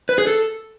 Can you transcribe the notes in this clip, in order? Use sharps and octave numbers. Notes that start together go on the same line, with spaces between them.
B4
G#4
A4